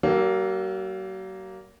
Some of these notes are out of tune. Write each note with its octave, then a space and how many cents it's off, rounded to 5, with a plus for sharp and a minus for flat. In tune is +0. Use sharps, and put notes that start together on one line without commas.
F#3 +45 A#3 +0 A4 +0